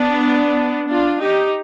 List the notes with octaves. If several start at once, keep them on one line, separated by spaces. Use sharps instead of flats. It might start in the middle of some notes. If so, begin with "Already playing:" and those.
Already playing: B3 D4
D4 F4
D#4 G4